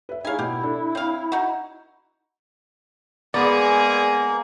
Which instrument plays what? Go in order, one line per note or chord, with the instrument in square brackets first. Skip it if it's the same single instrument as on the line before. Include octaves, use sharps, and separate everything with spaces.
[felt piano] B4 E5
[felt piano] D#4 G#4 C#5 [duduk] E4 [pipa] F5 G#5
[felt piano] B2 [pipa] G4
[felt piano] D4 A4
[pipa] C4 F5 [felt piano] C#5
[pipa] D#4 F#4
[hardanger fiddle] G#3 G#4 [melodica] A#3 [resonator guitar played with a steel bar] B3 [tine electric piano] D5